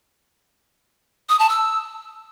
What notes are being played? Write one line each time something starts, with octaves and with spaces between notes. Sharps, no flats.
D#6
A5
E6